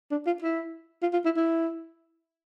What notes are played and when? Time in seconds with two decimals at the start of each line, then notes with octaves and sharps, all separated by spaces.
0.11 D4
0.26 F4
0.42 E4
1.02 F4
1.13 F4
1.25 E4
1.37 E4